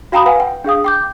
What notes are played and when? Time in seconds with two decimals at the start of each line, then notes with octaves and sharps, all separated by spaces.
0.12 F#4 F5 G5 A#5 B5 D#6
0.26 B4 F5 F#5 G#5
0.40 G5
0.64 D4 G#4 F5 D#6
0.84 G5 D6 G6